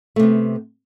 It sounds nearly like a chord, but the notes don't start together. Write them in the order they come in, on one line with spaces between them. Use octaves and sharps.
A3 C3 B3